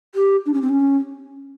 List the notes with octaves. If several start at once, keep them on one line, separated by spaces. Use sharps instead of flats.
G4
D4
C#4
C4
C#4